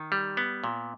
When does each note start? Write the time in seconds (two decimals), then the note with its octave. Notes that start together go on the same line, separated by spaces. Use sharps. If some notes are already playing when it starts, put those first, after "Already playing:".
Already playing: D#3
0.12 G3
0.37 B3
0.64 A#2